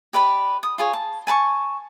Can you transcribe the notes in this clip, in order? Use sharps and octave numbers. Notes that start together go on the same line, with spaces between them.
G4 B4 D5 B5
D#6
F4 G#4 C#5
A5
G#5 A5 B5 C#6